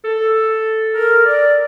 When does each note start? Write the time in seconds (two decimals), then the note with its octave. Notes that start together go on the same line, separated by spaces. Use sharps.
0.05 A4
0.95 A#4
1.26 D5